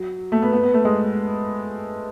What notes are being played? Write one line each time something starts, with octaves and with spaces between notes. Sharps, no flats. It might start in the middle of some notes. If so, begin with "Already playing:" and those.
Already playing: F#3
A3
B3
B3
B3
A3
G#3